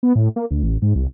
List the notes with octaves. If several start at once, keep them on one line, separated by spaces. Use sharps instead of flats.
B3
A2
A#3
D2
A1
G#2
C2